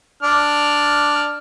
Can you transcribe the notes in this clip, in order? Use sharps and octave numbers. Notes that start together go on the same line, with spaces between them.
D4 F6